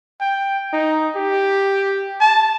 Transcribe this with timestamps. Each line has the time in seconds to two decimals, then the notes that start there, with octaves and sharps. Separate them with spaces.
0.20 G5
0.73 D#4
1.16 G4
2.21 A5